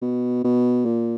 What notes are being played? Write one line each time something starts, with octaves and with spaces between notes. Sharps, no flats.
B2
B2
A#2